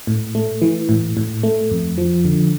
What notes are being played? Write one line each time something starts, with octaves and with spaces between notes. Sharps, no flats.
A2
A3
E3
A2
A2
A3
F2
F3
D3